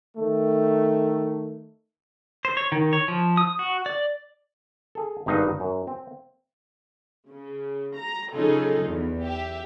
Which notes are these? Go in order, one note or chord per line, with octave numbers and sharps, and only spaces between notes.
D#3 A3
C5
C#5
D#3
C#5
F3
D#6
F#4
D5
G#4 A4
G#1 G2 D#4 F5 F#5
F#2
C4
C#3
A#5
C#3 F#3 D#4 F4 G#4 A4
E2
G4 E5